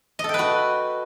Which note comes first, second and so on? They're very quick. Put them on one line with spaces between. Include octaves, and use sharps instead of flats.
D#5 A4 G5 B4 F#4